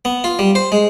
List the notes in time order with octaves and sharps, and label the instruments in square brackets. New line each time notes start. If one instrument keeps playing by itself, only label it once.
[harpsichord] B3
F4
G3
C5
G#3